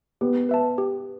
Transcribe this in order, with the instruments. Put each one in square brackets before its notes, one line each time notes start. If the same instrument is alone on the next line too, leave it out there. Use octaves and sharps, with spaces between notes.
[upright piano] B3 [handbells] G4
[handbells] B4 E5 A5
G4